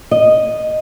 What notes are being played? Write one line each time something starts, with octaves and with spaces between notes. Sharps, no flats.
D#5